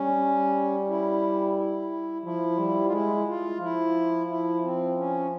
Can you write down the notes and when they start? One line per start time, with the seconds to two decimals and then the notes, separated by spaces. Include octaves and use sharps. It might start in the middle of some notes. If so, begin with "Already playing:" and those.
Already playing: G3 C#4
0.89 E4
1.57 E4
2.24 F3 E4
2.58 G3
2.86 F4
2.92 G#3 E4
3.27 F4
3.61 F3 E4
4.29 E4
4.63 C4
4.97 C#4